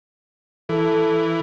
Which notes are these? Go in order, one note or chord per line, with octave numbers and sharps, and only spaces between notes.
E3 A4